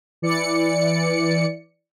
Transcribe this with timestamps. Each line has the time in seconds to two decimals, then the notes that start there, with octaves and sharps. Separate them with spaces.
0.22 E3 D5 C#7